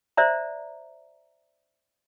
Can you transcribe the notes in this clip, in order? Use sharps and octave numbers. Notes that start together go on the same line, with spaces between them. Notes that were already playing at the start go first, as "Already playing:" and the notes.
C5 D5 E5 A#5